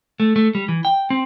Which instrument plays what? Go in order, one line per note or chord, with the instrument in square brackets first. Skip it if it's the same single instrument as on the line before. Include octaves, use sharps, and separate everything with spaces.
[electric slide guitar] A3
A3
G3
E3
G5
C4